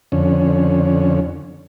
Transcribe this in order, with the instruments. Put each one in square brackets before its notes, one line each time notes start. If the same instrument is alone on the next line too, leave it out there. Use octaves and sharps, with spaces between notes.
[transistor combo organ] F2 D3 C#4